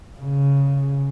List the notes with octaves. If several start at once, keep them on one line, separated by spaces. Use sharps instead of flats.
C#3